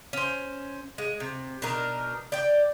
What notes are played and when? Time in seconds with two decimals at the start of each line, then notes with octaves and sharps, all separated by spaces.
0.13 C#4 C5
0.98 G#3
1.20 C3
1.62 B2 D4 D#4 A#4
2.32 D5 G5